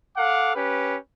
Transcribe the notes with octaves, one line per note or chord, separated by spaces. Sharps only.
A4 F5 F#5 D6
C#4 G4 B4